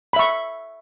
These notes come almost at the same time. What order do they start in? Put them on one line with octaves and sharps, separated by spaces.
B5 E5 C#6